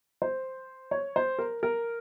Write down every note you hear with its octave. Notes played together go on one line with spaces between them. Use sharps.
C5
C#5
C5
A#4
A#4